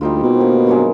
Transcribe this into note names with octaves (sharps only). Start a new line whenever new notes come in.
D2 G3 D#4 F4
B2 A#3 C4
D3 D#3 G3
G2 F#3 G#3